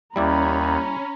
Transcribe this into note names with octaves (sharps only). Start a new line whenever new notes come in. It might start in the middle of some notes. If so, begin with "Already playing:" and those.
D#2 G3 C#4 E4 D5 A#5 B5